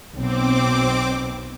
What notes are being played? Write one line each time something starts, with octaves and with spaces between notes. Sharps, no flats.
B1 B2 C4 D6